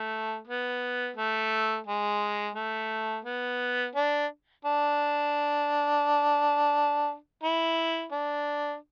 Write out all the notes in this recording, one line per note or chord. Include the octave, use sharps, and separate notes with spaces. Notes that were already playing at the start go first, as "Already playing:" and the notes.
Already playing: A3
B3
A3
G#3
A3
B3
D4
D4
E4
D4